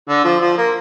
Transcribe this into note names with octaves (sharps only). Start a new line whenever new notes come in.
D3
F3
F3
A#3